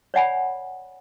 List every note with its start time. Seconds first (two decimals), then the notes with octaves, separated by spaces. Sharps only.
0.14 C#5 D5 F#5 G#5 B5